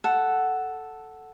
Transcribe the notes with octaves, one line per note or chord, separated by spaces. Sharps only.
A4 F#5